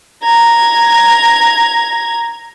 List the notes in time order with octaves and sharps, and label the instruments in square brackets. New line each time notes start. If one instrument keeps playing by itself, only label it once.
[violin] A#5 G#6